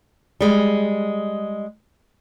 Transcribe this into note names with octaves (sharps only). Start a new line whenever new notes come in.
G3 G#3